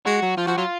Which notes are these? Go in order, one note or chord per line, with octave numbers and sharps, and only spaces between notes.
G#3 F#4
F#3
F3 F4
F3 F#4
F#3 F4